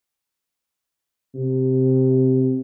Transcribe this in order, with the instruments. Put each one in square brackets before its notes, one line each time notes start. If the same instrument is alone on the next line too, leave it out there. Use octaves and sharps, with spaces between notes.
[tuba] C3